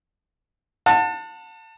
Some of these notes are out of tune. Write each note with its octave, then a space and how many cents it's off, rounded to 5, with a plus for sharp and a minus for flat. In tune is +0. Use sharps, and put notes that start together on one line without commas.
F#5 -30 A5 +25